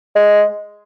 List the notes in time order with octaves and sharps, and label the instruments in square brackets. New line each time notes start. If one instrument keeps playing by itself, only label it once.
[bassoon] G#3